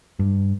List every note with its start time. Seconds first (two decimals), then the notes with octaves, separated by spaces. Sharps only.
0.19 G2